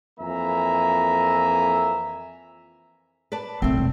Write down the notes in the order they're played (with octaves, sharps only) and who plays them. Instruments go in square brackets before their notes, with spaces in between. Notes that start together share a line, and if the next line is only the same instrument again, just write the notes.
[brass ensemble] F2 E3 A#3 E5 G#5 A#5
[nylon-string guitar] B4 D5 A5
[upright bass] A1 C3 [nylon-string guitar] A3 C4
[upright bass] E1